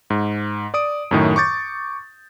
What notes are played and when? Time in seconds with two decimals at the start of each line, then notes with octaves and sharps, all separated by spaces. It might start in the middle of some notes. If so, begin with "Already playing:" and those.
0.10 G#2
0.74 D5 D#6 D7
1.11 F#2 A2 D#3
1.36 C#6 D6 G6 A6